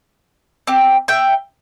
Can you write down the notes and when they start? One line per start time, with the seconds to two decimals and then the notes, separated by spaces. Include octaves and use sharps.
0.67 C4 G4
1.08 E5 G5